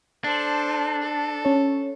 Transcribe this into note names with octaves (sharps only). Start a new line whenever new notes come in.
D4 A4 C5
A4
C#4 C#5